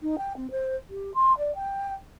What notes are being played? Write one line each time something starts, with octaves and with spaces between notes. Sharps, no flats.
D#4
G5
C4
C5
G4
C6
D5
G5